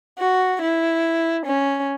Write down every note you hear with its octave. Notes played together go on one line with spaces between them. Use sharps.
F#4
E4
C#4